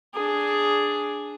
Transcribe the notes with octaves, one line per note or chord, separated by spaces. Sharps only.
D4 G#4